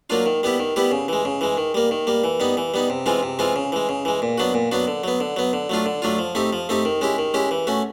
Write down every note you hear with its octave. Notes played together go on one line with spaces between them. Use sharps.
F#3 A#3 D4 F4
D#3
G3 B3 E4 G4
D#3
G3 B3 E4 G4
C#3
E3 G#3
C#3
E3 G#3
D#3
G3 A#3
D#3
G3 A#3
E3
G3 B3 D#4
E3
G3 B3 D#4
C3
E3 G#3 C4 F4
C3
E3 G#3 C4 F4
C#3
E3 G#3
C#3
E3 G#3
A#2
F#3 B3 D4 F#4
A#2
F#3 B3 D4 F#4
D3
F#3 B3
D3
F#3 B3
D3
F#3 A3 D4 F4
D3
F#3 A3 D4 F4
F3
A3 C4 D#4 G4
F3
A3 C4 D#4 G4
D#3
G#3 C#4 E4 G4
D#3
G#3 C#4 E4 G4
E3
A3 C#4 F#4